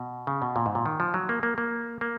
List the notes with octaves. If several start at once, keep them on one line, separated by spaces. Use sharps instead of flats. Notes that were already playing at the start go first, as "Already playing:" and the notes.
Already playing: B2
C#3
B2
A#2
G#2
A#2
D#3
F3
F#3
A#3
A#3
A#3
A#3